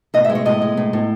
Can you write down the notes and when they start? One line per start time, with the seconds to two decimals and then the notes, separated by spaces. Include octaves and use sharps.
0.14 A2 D#5
0.25 E5
0.30 G#3
0.35 C#5
0.45 A2 D#5
0.62 G#3
0.77 A2
0.93 A2